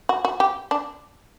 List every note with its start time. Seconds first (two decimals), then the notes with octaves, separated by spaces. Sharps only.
0.09 F#4
0.25 F#4
0.40 G4
0.71 D4